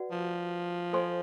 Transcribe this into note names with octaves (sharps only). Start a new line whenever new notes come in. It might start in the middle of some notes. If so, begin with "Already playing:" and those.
Already playing: F#4 B4 D5 F#5
F3
A4 C5 D#5 G#5 C6